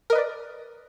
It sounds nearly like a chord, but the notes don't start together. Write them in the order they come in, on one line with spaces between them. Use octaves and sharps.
A#4 D#5 B4 D5